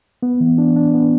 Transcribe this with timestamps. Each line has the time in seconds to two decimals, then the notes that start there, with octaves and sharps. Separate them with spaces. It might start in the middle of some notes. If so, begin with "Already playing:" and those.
0.23 B3
0.41 E3
0.58 D4
0.76 D4
0.94 B3